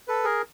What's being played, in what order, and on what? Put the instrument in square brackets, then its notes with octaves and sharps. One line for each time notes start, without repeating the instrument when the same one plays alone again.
[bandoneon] A4 B4
G#4 A#4